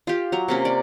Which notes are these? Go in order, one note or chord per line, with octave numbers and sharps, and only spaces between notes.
F4 G4
F#3 A#5
C3 A#3 C#4
D5